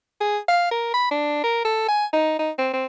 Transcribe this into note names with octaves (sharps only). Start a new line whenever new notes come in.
G#4
F5
A#4
B5
D4
A#4
A4
G#5
D#4
D#4
C4
C4